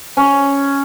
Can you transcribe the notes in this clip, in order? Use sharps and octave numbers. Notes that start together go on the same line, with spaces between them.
C#4